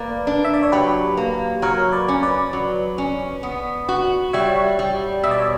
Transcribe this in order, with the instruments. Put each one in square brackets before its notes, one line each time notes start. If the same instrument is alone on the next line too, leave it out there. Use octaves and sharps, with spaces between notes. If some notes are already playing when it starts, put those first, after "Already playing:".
Already playing: [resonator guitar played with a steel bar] A#3 [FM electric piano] B4 D5
[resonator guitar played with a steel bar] D4
[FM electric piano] E5
D5
C#5
[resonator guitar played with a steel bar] F#3 [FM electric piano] G4 B4
[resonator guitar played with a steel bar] A#3
[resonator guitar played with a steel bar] F#3 [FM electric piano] A#4 C#5
[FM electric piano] B4 D5
[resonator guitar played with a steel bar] C#4
[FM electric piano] B4 D5
[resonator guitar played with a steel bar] F#3
C#4
B3
F#4
[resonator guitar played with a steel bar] G3 [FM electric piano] C#5 E5
[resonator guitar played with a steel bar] G3
[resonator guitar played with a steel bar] B2 [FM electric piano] E5
[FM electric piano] D5
C#5